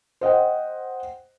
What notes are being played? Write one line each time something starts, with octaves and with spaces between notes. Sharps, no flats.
C5 D#5 F#5 G5